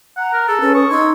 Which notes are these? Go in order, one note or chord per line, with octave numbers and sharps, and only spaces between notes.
F#5 A#5
A#4
G#4 A4
C#4 B4
C#6 D#6
D#4 C6 E6 G#6